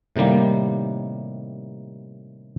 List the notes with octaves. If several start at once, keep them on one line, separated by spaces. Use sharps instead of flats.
A2 C3 D#3 G3 A#3